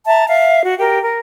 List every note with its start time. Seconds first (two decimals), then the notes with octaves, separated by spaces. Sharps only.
0.06 E5 A5 A#5
0.27 E5 F5
0.63 F#4
0.77 G4 A#4
1.01 A#4